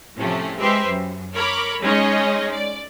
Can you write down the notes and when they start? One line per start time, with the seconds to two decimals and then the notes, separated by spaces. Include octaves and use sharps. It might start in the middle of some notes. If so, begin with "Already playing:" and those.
0.18 A2 C3 F3 A3 C#4
0.59 G#3 G4 B4 C5 E5
0.88 F#2
1.34 A#4 C#5 B5 D6
1.82 G#3 C#4 D#4 G#4 C#5 D#5
2.52 D5